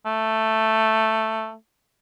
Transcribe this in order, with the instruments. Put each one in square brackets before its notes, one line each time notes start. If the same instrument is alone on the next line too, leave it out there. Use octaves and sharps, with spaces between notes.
[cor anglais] A3